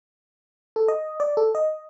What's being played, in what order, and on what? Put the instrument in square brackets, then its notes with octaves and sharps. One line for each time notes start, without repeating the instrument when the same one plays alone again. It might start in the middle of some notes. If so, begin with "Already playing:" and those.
[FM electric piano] A4
D#5
D5
A4
D#5